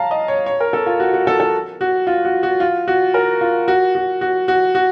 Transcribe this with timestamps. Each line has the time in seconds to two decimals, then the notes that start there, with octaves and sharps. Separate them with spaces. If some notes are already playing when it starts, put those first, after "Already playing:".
Already playing: F5 A5 A#5
0.11 D#5
0.28 C#5
0.46 C#5
0.60 A#4
0.73 A4
0.86 F4
1.00 F#4
1.13 F#4
1.27 A4
1.40 A4
1.81 F#4
2.07 F4
2.25 F#4
2.43 F#4
2.60 F4
2.88 F#4
3.14 A#4
3.41 F4
3.68 F#4
3.95 F#4
4.21 F#4
4.48 F#4
4.75 F#4